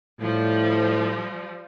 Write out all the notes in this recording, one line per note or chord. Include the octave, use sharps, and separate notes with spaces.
A2 F3 G3